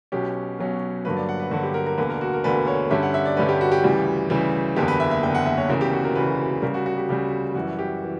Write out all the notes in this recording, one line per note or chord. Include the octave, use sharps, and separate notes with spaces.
B1 B2 F#3 C#4 G4
B1 B2 F#3 C#4
G2 D3 F#3 A#3 B4
D5
F#5
B4
G2 D3 F#3 A#3 F#4
G4
A#4
A#4
E1 D2 D3 A#3 B4
A#4
F#4
A#4
E1 D2 D3 A#3 B4
C#5
G2 D3 G3 C#4 E5
F#5
E5
D5
G2 D3 G3 C#4 B4
G4
F#4
G4
D2 C#3 E3 G3
D2 C#3 E3 G3
F#1 E2 D3 A#3 G4
B4
E5
E5
F#1 E2 D3 A#3 G5
F#5
E5
C#5
E1 D2 C#3 E3 A#4
G4
F#4
A#4
E1 D2 C#3 E3 B4
D2 C#3 G3 A#4
F#4
F#4
G4
D2 C#3 G3 G4
F#2 E3 G3 F#4
G4
E3